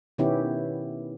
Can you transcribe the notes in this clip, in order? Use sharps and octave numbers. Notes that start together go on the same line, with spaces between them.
B2 D#3 B3 C#4 E4 G4